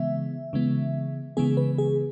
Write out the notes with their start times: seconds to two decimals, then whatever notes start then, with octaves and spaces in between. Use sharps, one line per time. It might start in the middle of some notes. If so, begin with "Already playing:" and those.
Already playing: C#3 E3 G#3 B3 E5
0.53 C#3 E3 G#3 B3
1.37 C#3 E3 G#3 B3 G#4
1.57 B4
1.78 G#4